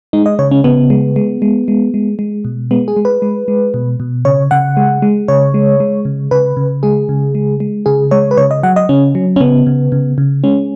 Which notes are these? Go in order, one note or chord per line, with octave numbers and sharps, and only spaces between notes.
G#3 D#4
D#5
C#3 C#5
C#4
C#3 B3
G#3
G#3
G#3
G#3
G#3
G#3
B2
G#3 B3
G#4
G#3
B4
G#3
G#3
B2
B2
C#3 C#5
C#3 F#5
G#3
G#3
C#3 C#5
G#3
G#3
C#3
C#3 B4
C#3
G#3 G#4
C#3
G#3
G#3
C#3 G#4
G#3 C#5
B4
C#3 C#5
D#5
F#3 F#5
D#5
C#3 C#4
F#3
C#4
C#3 B3
C#3
C#3
C#3
G#3 C#4